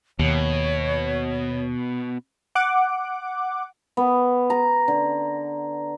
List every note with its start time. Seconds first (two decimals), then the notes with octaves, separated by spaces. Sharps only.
0.19 D#2 B2 C#5
2.55 F#5 D6
3.97 B3
4.50 A#5
4.88 D3